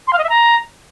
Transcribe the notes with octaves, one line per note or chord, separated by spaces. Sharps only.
C6
F5
D#5
E5
A#5